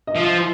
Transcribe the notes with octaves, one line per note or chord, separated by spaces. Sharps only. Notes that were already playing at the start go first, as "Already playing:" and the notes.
D#5
F3 E5